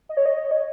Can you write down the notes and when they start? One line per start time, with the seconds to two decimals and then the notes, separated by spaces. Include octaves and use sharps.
0.09 D#5
0.17 C#5
0.26 D#5
0.51 C#5